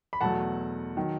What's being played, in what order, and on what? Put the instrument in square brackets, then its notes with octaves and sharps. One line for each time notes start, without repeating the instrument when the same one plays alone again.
[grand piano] B5
E2 B2 F#3 A3 F#5 A5
D#3 F#3